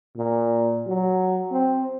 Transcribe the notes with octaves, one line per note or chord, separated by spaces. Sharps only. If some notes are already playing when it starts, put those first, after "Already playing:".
A#2
F#3
C4